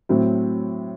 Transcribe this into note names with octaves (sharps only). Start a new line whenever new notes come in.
A2 F#3 C4